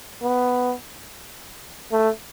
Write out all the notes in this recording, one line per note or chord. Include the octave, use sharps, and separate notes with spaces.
B3
A3